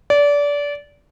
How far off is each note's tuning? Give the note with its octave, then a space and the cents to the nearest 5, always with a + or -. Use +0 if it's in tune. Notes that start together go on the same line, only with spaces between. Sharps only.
D5 -25